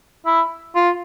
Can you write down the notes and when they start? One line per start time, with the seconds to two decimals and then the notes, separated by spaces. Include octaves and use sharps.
0.26 E4
0.75 F4